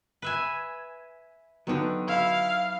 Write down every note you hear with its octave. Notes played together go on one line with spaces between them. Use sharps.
B4 E5 G#5
D3 D#3 F#3 B3 D#4
E4 F5